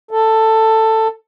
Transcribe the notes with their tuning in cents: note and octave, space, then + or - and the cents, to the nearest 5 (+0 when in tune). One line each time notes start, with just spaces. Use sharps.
A4 +10